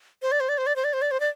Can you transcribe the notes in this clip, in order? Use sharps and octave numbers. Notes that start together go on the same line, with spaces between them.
C5
D5
C5
D5
C5
D5
C5
D5
C5
D5
C5
D5